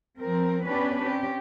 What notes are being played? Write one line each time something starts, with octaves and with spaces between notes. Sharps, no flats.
F3 C4 A#4
B3 C#4 D4 G4 B4
C4 C#4 G4